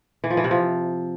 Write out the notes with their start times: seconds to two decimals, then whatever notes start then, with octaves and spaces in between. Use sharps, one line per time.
0.24 E3
0.30 F3
0.37 E3
0.44 C3
0.51 F3